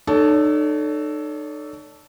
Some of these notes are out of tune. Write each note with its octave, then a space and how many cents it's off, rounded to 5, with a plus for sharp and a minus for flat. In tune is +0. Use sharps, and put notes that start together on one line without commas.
D#4 -40 A4 +0 C#5 +35